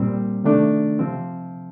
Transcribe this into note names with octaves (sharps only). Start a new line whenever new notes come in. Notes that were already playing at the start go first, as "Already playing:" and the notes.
Already playing: A#2 G3 C4
C3 D#3 A3 D4
C3 F3 C4